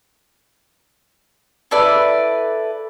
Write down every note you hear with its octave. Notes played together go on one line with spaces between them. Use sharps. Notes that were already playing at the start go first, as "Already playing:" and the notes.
E4 A4 B4 D5